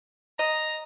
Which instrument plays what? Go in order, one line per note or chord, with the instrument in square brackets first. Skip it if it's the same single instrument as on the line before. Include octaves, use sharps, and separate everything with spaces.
[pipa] D#5 [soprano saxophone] A#5